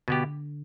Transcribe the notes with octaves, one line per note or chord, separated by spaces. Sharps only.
B2 D3 B3 G4